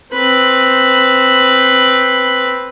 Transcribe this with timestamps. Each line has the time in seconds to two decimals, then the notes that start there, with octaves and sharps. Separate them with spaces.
0.13 C4 B4